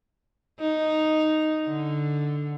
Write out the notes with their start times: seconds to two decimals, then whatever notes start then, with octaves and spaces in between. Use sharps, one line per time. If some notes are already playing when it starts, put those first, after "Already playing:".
0.60 D#4
1.68 D3